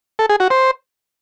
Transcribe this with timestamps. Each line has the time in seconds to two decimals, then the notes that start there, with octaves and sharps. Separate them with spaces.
0.19 A4
0.29 G#4
0.40 F#4
0.50 C5